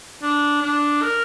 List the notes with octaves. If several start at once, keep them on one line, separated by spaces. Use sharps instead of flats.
D4
D4
A#4